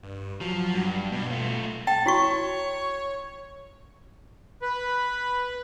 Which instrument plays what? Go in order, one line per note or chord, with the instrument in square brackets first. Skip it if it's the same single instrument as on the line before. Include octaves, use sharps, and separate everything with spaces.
[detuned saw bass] G2
[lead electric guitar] F3 [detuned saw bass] F#3
[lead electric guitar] G2
[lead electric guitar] G2 [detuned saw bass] B2
[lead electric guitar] A3 F4
[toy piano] G5 [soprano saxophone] A5
[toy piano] E4 F#4 C#6 [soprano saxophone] C#5
[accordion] B4